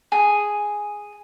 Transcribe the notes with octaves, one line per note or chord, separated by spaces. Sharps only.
G#4